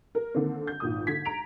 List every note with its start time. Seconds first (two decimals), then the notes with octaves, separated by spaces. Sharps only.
0.15 A#4
0.35 D3 D#3 A#3 C4
0.67 G6
0.80 G#1 A#2 D#6
1.07 D3 G#6 B6
1.25 A#5 D7 F7